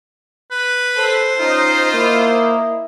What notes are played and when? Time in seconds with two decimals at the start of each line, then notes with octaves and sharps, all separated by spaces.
0.51 B4
0.97 A4 C5
1.39 C#4 D#4 F4
1.95 A#3 E4 D#5